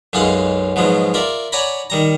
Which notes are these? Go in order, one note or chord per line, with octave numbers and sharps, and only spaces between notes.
B1 F#2 G#3 F4 F5 F#5
G#2 B2 F3 F#3 G#3
F4 A#4 D5 E5
C#5 D5 F#5 G#5 A#5 B5
D#3 G3 A#5